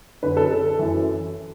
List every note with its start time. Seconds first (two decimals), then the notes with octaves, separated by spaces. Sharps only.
0.22 F#2 D3 B4
0.37 A4
0.51 A4
0.79 F#2 E3